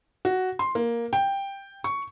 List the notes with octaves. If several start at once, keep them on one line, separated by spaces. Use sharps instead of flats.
F#4
C6
A#3
G5
C#6